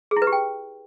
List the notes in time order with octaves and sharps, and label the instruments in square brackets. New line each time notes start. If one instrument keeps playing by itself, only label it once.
[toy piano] G#4
E4
B4
G4
G5